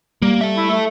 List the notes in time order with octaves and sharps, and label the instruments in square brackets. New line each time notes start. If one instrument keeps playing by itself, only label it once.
[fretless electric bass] G3 [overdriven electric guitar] A#3
[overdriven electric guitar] A4 E5
[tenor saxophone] E4
A3